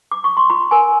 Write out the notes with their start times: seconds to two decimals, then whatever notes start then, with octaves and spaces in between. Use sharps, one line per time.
0.11 D6
0.24 C#6
0.37 C6
0.50 F4 B5
0.71 A#4 G#5